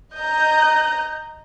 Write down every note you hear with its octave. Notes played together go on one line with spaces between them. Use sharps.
D#5 A#5 G6